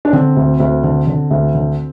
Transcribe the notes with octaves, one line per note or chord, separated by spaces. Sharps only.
D4
D3 C4
D2
D2
D3
D3
D2
D3